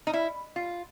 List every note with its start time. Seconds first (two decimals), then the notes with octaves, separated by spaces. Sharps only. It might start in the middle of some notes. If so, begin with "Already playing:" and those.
0.07 D#4
0.13 E4
0.56 F4